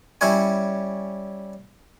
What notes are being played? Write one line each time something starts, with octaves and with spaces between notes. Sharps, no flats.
G3 C#4 E4 C#5 G#5